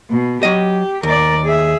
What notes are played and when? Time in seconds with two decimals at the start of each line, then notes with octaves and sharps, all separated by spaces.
0.10 B2
0.43 F#3 G4 D#5
1.03 D#2 A#4 D5
1.45 G#4 E5